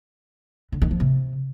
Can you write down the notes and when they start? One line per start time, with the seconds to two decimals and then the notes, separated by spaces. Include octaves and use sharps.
0.72 D3
0.82 D#3
0.91 F3
1.00 C3